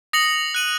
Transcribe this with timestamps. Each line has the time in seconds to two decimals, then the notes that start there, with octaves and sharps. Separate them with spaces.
0.13 D#6 A#6 C#7 F#7
0.54 F#6 D#7 F#7